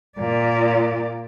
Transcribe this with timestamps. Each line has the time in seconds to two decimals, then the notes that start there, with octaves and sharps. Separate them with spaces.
0.18 A#2 D5